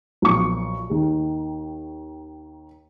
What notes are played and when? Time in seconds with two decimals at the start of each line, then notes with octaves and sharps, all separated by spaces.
0.22 B1 A#2 F3 C#6
0.90 D#2 D#3